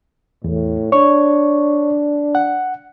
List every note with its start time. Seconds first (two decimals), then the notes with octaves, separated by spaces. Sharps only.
0.44 E2 A2
0.92 D4 C#5 C#6
2.35 F#5